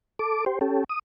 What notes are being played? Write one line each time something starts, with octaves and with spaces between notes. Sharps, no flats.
A4 D6
G4 C5
C#4 G4 A4
D#6